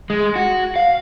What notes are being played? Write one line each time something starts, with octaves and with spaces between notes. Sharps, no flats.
G#3
F#4
F5